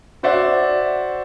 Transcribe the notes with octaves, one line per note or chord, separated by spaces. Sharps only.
F#4 C5 D5 E5 F#5